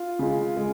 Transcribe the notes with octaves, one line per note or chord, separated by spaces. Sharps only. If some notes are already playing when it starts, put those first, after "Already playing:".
Already playing: F4
C#3 G#3
G#3